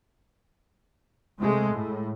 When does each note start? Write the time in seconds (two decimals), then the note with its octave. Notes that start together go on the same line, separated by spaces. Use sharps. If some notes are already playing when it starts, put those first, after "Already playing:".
1.40 C3 G#3 A3
1.72 A2